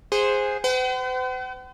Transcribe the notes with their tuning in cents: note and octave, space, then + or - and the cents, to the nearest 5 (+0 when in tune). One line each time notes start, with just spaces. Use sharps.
G#4 -10 C5 +0 F#5 -10
C5 -45 F#5 +45